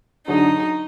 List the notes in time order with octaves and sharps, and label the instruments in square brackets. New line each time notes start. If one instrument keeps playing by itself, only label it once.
[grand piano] D3 F#3 D4 G#4 [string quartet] D#4